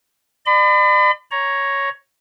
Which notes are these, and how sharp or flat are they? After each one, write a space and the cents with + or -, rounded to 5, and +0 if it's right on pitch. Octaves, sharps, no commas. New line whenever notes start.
D5 +40 B5 +40
C#5 +0 A#5 +10